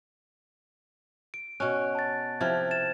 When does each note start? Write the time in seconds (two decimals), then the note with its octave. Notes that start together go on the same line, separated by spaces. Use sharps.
1.34 D7
1.60 B2 C#4 F#6
1.95 A5 A6
2.41 C3 F3 E4 F6 G#6
2.71 A6 E7